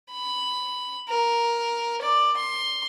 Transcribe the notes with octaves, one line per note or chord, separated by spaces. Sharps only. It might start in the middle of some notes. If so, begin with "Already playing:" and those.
B5
A#4
D5
C6